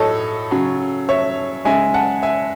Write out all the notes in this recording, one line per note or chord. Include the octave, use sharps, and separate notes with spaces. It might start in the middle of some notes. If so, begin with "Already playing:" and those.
Already playing: A2 F#3 A4 C#5 D#5
C#3 F#3
C#5 E5
C#3 G#3 E5 G#5
F#5 A5
E5 G#5